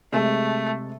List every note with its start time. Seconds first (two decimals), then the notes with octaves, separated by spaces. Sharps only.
0.12 C3 G#3 A3